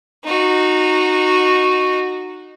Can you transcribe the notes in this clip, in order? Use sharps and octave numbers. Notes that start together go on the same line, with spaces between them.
D#4 F#4